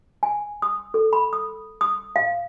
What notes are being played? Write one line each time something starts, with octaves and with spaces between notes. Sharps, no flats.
G#5
D#6
A4
B5
D#6
D#6
F5